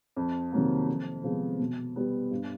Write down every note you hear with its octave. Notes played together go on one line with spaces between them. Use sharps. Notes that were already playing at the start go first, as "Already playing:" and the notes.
F2
C3 D#3 F#3 A#3
F2
C3 F3 G#3 B3
B2
G3 B3
G2